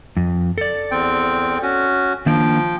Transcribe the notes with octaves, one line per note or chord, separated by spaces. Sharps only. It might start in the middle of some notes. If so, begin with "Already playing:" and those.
F2
A4 D5
E2 C4 G5
C#4 F#4
D#3 F3 A#3 D4 G5